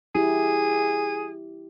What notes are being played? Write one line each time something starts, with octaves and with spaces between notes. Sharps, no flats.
E4 G4 G#4